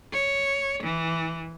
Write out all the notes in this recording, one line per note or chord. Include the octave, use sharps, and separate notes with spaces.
C#5
E3